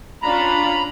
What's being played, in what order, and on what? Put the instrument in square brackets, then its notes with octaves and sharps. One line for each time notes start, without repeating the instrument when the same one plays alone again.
[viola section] C#4 D4 F4 [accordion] A#5 B5